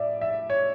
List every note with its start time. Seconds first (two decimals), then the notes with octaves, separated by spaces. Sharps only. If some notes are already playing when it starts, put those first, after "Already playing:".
Already playing: A2 D5 E5
0.21 E5
0.50 C#5